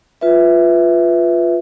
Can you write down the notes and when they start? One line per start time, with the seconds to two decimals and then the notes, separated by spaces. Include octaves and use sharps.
0.21 F4 B4 E5